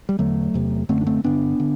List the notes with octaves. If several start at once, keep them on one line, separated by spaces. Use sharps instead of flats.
G3
E2 D3 F#3 A3
E2 C3
F#2 D3 A3 C4
D4
A3 C4
G2 D3 B3 D4
D3